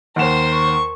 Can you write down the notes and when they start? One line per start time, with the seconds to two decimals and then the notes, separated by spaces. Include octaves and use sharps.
0.16 D#2 A#4 C5 F#5 E7
0.53 C#6